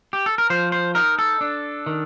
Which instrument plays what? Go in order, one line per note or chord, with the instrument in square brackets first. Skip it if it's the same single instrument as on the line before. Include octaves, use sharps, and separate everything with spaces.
[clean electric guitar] G4
A4
A#4
F3 C5
C5
D#4 A#4
A4
D4
D#3